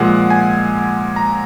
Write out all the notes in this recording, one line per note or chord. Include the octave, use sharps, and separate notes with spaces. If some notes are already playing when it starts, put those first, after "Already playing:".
Already playing: A#2 F3 G#3 F#5
G#5
A#5